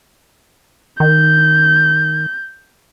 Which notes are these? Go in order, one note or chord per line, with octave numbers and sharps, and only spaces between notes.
D#3 G6